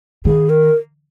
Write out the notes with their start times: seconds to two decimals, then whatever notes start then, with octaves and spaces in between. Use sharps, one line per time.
0.25 D#3 G#4
0.49 A#4